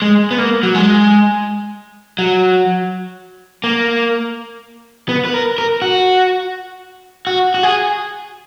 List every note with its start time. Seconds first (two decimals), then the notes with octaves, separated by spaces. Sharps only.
0.02 G#3
0.31 B3
0.38 A#3
0.63 F#3
0.75 G#3
2.19 F#3
3.64 A#3
5.09 B3
5.25 B4
5.34 A#4
5.58 A#4
5.82 F#4
7.27 F#4
7.54 F#4
7.63 G#4